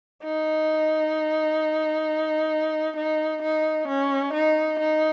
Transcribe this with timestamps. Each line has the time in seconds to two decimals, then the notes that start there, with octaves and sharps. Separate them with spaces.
0.24 D#4
2.97 D#4
3.42 D#4
3.88 C#4
4.33 D#4
4.79 D#4